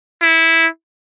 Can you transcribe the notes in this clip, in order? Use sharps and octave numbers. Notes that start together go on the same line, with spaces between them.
E4